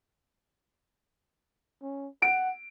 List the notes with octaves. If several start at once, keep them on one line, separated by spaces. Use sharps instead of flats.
C#4
F#5 D7